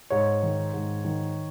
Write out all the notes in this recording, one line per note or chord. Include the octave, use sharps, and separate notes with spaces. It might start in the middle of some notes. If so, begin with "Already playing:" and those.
G#2 C#5
D#3
G#2
D#3